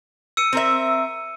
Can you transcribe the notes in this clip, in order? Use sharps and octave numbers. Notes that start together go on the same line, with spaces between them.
E6 C#7 D#7
C4 A#4 E5